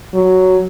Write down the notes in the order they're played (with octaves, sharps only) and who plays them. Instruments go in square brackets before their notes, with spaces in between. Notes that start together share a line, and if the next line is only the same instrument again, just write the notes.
[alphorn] F#3